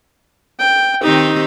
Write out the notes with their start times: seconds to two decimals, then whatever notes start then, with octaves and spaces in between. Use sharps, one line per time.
0.59 G5
1.03 D#3 C4 D#4 G4